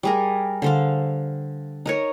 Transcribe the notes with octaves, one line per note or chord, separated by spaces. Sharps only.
G3 G#4 A#4
D3 C5 F5
D#4 A#4 C#5